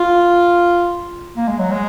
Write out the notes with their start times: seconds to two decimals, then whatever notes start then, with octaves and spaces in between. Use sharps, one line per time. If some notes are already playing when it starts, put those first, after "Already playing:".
Already playing: F4
1.37 A#3
1.48 G#3
1.59 F#3
1.71 G#3